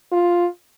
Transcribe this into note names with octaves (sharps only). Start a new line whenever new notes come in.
F4